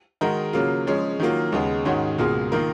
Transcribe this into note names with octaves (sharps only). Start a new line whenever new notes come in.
D#3 G#3 D#4 F#4 A#4
C#3 F#3 A#3 F4
F3 G#3 C#4 G#4
D#3 F#3 A#3 F4
D#2 C#3 G#3 B3
G#2 D#3 G#3 C#4 F#4
C#2 B2 A#3 F4 G#4
D#3 A#3 F4 A#4